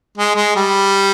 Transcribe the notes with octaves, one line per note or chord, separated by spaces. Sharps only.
G#3
G#3
G3